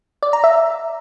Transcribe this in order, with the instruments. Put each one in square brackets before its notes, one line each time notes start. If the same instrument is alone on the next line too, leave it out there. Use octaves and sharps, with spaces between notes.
[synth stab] D5
A#5
E5